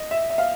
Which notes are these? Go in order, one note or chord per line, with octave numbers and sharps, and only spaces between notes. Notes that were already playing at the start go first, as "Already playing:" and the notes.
Already playing: D#5
E5
E5
F5